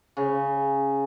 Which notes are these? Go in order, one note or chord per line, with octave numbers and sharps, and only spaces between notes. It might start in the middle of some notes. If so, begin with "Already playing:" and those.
C#3